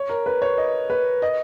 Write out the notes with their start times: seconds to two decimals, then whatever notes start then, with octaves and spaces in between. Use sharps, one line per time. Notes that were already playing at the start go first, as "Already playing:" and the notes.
Already playing: C#5
0.09 A#4
0.26 B4
0.42 C#5
0.58 D#5
0.90 B4
1.22 D#5